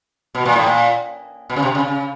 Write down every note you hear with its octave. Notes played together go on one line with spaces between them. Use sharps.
B2
A#2
A2
A#2
B2
C#3
C3
C#3
C#3